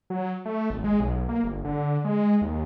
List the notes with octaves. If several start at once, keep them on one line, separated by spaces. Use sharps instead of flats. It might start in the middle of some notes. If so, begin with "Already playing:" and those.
F#3
A3
G#1
G#3
B1
A#3
G1
D3
G#3
D#2